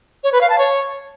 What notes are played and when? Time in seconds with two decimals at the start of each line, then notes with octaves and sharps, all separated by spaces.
0.24 C#5
0.32 B4
0.41 F5
0.50 A5
0.58 C#5